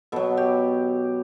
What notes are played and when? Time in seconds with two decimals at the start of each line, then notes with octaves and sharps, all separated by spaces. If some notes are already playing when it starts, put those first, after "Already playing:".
0.12 B2 F#3 A4
0.37 G4